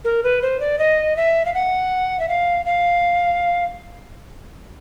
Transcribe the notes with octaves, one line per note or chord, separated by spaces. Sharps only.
A#4
B4
C5
D5
D#5
E5
F5
F#5
E5
F5
F5